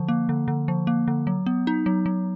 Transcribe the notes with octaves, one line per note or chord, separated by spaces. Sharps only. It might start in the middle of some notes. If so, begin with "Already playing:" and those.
Already playing: D3 F3
A#3
D3
D3
F3
A#3
D3
F#3
B3
D#4
F#3
F#3